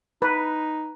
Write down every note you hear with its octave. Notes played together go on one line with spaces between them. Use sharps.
D#4 B4